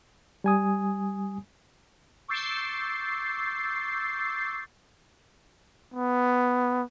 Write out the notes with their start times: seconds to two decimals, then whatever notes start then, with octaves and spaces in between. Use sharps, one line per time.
0.44 G3 G#5 D#6
2.28 C#6 D6 E6 G6 A6 C7
5.94 B3